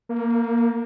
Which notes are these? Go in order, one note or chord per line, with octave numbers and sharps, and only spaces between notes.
A#3